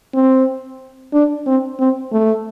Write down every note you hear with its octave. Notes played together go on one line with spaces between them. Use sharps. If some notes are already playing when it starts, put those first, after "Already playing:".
C4
D4
C4
C4
A3